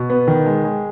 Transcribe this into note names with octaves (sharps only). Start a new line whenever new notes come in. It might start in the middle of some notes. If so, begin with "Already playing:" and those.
Already playing: B2
B3
D#3
G#3
G#3